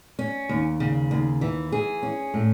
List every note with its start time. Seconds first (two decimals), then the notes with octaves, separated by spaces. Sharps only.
0.19 C#4
0.49 D#2
0.80 C#3
1.11 D#2
1.41 E3
1.72 G#4
2.03 C#4
2.34 A2